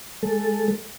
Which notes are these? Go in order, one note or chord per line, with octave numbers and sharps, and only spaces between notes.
G#3 A4